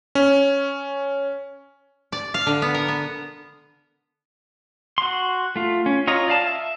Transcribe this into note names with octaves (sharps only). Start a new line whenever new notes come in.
C#4
D5
F5
D3
B3
A#4
B3
F#4 C6
A3 F4
C#4
F4 C#5 D#5 A#5
D5 F5 A5
E5